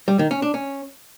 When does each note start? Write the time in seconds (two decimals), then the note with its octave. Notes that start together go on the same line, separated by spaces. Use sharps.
0.08 G3
0.19 D#3
0.31 C#4
0.42 D4
0.54 C#4